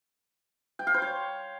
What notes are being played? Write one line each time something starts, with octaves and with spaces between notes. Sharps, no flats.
G5
F5
C5
C#5